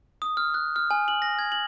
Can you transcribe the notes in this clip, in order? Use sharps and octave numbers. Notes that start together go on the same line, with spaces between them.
D#6
F6
F#6
F6
G#5
F#7
A#6
G#6
F#7